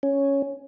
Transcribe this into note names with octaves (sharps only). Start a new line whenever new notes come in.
C#4